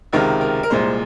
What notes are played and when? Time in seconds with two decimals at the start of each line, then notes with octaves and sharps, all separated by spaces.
0.13 C#2 C3 D#3 G#3 A#4
0.41 A#4
0.63 A#4
0.70 C2 A#2 G#3 C5